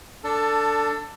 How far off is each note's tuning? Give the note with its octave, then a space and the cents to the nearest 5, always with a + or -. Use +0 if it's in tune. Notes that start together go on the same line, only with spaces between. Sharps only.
D4 +0 A4 +20